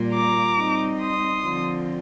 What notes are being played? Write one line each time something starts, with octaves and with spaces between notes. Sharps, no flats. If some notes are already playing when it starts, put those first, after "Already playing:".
Already playing: A#2 G3 A#3 F4
A#5 D6
G3 C4 D#4
C6 D#6
D3 F3 C4 F4